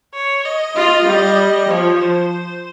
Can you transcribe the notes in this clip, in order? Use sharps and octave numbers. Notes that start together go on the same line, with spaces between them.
C#5
D#5
F4
G3
F3 C#5
C5